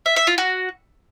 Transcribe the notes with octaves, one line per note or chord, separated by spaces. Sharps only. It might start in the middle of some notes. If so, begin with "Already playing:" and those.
E5
E5
F4
F#4